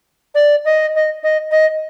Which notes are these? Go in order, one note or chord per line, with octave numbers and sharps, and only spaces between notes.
D5
D#5
D#5
D#5
D#5